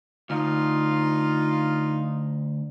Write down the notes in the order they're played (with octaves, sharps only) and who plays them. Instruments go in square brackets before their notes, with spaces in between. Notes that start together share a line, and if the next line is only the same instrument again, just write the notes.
[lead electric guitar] D2 [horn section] D#4 F4